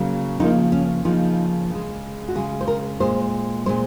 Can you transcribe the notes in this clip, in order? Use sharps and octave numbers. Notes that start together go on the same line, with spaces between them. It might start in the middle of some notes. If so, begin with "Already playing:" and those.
Already playing: C#3 F#3 A#3
C#3 F3 A#3 D#4
C#4
C#3 F3 A#3 D#4
C#3 G#3
F#4
C#3 G#3 G#4
C5
A#4
A#2 G#3 C5
A#2 G#3 C5